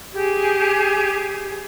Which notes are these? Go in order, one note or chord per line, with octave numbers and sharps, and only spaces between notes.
G4 G#4 G#6